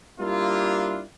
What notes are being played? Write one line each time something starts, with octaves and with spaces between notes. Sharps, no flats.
G3 A#3 D4 E4 F4